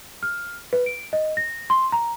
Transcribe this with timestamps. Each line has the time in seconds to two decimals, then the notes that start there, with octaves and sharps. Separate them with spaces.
0.23 F6
0.73 B4
0.86 D7
1.13 D#5
1.37 A#6
1.70 C6
1.92 A#5